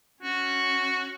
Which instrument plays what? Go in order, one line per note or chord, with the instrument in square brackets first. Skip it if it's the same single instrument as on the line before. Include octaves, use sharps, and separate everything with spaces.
[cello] C#4 [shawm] F#4